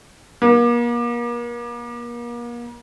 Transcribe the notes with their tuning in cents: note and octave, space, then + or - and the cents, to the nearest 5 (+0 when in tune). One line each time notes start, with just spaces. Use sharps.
A#3 +40